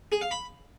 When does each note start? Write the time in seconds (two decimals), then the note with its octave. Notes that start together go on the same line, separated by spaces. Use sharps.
0.12 G#4
0.21 F5
0.31 B5